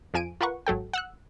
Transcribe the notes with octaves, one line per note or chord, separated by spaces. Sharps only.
F2 F3 G#5 D7 D#7
F4 A#4 B4 F#5 C#6
G#1 F#3 A4 G5
F#5 E6 F#6